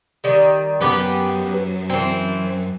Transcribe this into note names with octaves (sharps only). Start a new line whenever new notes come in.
D#3 G3
F#2 B3 G4 B4
E3 C4